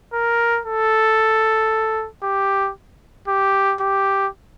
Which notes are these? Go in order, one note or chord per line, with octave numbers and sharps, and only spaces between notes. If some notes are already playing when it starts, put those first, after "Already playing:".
A#4
A4
G4
G4
G4